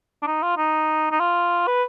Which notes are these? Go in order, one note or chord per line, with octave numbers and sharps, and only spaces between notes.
D4
D#4
F4
D#4
D#4
F4
B4